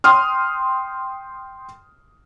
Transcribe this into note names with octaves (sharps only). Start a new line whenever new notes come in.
G5 C6 D#6 F6